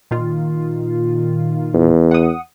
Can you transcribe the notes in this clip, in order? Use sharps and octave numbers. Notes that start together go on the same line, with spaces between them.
A#2 D#3 F4
E2
F#5 D#6